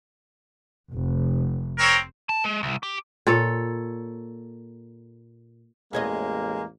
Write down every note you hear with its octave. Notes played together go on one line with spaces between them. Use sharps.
F1
C4 A#4 C#5
A5
G#3
C2
G4
A#2 A4 C#5
A1 E2 G#3 A#3 C#5 D#5